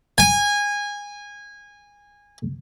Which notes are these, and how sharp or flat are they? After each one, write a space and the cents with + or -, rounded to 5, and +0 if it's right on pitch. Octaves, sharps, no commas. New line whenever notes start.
G#5 -20